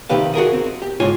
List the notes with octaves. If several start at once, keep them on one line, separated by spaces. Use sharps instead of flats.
C3 D#3 G4 B4 F5
F#4 G#4 A#4 D#5
C4
G4
C#2 G#2 F4 G#4 C#5 G#5